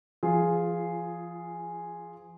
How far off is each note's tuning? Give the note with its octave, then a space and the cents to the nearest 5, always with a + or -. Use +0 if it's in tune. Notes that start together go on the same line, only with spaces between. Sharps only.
F3 -35 F4 +0 G#4 +0